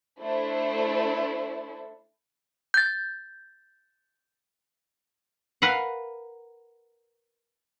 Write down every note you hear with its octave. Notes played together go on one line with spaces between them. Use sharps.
A3 D4 E4 A4 C5
G6 A6
A#4 B4 F5 F#5